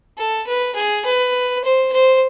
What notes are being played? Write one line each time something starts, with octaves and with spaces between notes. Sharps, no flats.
A4
B4
G#4
B4
C5
C5